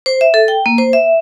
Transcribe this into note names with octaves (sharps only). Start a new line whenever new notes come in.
C5
E5
A4
G5
A#3
C5
E5